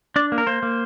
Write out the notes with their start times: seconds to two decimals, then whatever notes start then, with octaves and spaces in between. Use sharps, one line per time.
0.16 D4 D5
0.32 A#3
0.38 A#4
0.47 A#3 C5
0.63 A#3